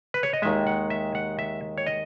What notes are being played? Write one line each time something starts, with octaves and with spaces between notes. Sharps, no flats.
B4
C#5
D#5
D#2 D#3 G#3 E5
F#5
E5
F#5
E5
C#5
D#5